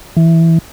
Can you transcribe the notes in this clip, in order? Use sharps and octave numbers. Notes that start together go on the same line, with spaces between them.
E3